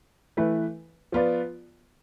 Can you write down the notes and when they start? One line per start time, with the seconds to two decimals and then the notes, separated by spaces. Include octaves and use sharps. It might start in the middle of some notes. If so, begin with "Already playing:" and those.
0.37 E3 A3 E4 B4
1.12 F3 B3 F4 B4 D5